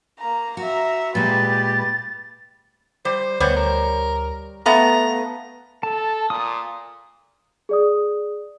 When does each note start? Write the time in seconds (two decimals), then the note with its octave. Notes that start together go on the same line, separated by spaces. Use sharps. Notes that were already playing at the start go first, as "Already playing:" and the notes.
0.19 A#3 A#5
0.57 F#4 E5 A#5
1.15 A#2 G#3 G4 B4 A6
3.05 G3 C5
3.40 D2 G3 B3 C5 C#5
3.56 A#4
4.66 A3 B3 F5 A#5
5.83 A4 A5
6.30 A#2 D#6
7.69 G#4 D5 D#6